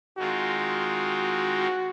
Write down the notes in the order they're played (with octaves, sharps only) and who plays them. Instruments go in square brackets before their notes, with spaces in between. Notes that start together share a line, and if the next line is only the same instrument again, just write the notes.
[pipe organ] D#3 G#3 C4 F4 [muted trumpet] F#4